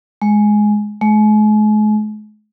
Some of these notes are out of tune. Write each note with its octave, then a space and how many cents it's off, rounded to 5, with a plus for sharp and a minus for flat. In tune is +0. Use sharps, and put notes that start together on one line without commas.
G#3 +10
G#3 +40